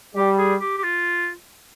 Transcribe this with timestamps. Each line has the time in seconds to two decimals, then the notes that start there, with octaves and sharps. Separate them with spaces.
0.15 G3 G4
0.38 G#4
0.61 G4
0.78 G4
0.84 F4